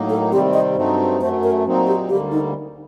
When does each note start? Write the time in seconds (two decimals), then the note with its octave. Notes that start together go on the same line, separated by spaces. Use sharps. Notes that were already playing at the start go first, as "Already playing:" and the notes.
Already playing: A2 F#3 A#3 D#4
0.09 A4
0.31 C3 D#3 G3 C4 G4
0.53 D#5
0.76 G2 F#3 A3 C4 D#4 C5
1.20 F#2 F#3 A3 C5
1.43 A#4
1.65 A#2 F#3 C4 D#4
1.87 G4
2.09 D2 D3 G3 A#3 G4
2.32 D#4